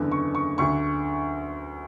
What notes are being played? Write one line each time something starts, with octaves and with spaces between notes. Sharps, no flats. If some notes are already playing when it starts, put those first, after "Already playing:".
Already playing: F#1 E2 D3
C#6
C#6
D2 D3 C#6